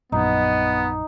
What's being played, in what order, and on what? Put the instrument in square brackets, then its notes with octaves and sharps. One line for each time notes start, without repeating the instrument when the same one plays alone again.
[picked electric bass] A#1 F#2 [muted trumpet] B3 [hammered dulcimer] D#4